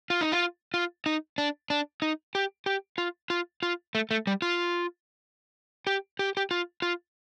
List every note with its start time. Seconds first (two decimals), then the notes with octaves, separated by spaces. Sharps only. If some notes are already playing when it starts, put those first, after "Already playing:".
0.10 F4
0.21 D#4
0.32 F4
0.74 F4
1.06 D#4
1.38 D4
1.70 D4
2.02 D#4
2.35 G4
2.66 G4
2.98 F4
3.30 F4
3.63 F4
3.95 A3
4.11 A3
4.27 G3
4.42 F4
5.87 G4
6.19 G4
6.37 G4
6.51 F4
6.82 F4